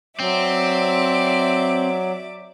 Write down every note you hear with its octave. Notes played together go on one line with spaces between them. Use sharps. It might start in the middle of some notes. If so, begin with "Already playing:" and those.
F#3 C4 D5 E5 D6